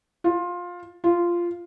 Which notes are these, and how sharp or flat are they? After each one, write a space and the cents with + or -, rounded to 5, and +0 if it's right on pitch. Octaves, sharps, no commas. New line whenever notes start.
F4 +15
F4 -10